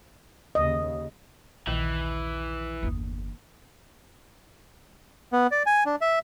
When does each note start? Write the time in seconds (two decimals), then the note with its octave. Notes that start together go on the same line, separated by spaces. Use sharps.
0.55 D#2 C#3 D#5
1.67 A#1 D#2 C3 D#3 E3
2.83 G1 E2 A#3 D#6
5.33 B3
5.51 D5
5.66 G#5
5.86 D4
6.01 E5